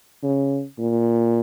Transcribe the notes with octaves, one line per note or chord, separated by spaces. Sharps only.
C#3
A#2